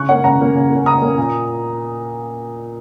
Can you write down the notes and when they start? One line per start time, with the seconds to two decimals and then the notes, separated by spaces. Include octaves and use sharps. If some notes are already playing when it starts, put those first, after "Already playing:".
Already playing: C#3 C#6 F#6
0.09 A#3 C#4 C#5 F#5
0.24 C#3 F#5 A#5
0.40 A#3 C#4
0.55 C#3
0.70 A#3 C#4
0.86 C#3 A#5 D#6
1.02 A#3 C#4
1.18 A#2